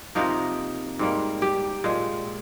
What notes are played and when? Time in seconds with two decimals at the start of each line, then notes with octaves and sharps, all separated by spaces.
0.15 C3 F3 A#3 D#4
0.99 G#2 G3 A#3
1.42 G4
1.84 A#2 G#3